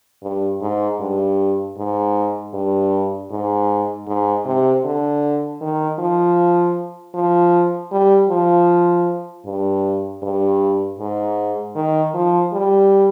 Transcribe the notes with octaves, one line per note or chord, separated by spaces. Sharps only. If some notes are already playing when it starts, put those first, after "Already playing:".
G2
G#2
G2
G#2
G2
G#2
G#2
C3
D3
D#3
F3
F3
G3
F3
G2
G2
G#2
D#3
F3
G3